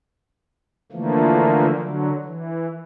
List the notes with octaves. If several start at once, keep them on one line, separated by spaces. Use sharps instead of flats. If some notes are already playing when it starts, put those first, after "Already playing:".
D3 E3 F3 A3 A#3
D3 F#3
E3